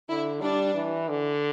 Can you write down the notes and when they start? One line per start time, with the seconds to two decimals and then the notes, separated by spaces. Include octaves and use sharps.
0.09 D3 E4
0.41 G3 D4
0.74 E3
1.09 D3